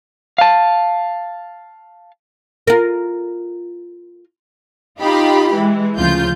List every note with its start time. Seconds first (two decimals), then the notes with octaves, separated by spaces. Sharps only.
0.38 F5 A5
2.67 F4 A#4
5.00 D#4 F4 G4 B5
5.54 E3 G#3
5.98 D2 C#3 F3 F4 G6